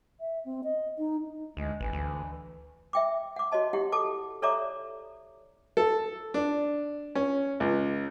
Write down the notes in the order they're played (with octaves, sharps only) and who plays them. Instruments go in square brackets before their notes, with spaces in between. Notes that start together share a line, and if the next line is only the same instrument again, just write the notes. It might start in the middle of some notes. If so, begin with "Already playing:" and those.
[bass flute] E5
C4
D#5
D#4
[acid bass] D2 [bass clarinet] G#3
[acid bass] A1 [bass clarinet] E3
[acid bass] D2
[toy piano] E5 G5 D6
F#5 D6
F#4 C#5 D#5 A5
E4 G4 F#5
A4 A5 D6
A4 C#5 D5 E5 A#5 D6
[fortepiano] A4
D4
C#4
C#2